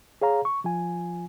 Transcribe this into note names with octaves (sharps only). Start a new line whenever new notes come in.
G#4 C#5 F5 A#5
C#6
F3 F4 G#5